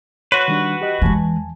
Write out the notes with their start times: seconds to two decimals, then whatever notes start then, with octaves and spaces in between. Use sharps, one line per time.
0.32 F#4 B4 C#5 C6
0.48 D#3 G3 D4
0.81 G4 D#5
1.02 E2 E3 G#3 G#5 A5